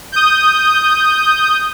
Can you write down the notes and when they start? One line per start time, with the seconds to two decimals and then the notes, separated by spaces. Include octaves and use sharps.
0.12 D#6 G6